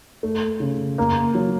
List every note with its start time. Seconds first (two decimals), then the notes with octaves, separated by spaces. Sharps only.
0.23 A3
0.60 C#3
0.98 A#3
1.35 F#3